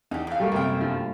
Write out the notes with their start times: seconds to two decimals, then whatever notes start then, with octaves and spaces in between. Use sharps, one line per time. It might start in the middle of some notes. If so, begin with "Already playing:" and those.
0.11 E2 D#4 G4
0.27 F2 F5
0.40 G3 A3 A#3
0.52 F#2 C3 A#4 G5
0.81 G2 F3